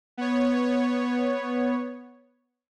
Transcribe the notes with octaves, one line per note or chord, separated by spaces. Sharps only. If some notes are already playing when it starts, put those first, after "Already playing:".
B3 C#5